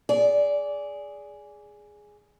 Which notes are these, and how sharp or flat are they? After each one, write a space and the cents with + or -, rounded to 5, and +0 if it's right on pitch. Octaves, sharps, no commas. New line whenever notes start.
G#4 +0 D5 -15